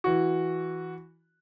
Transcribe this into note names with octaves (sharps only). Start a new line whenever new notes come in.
E3 F#4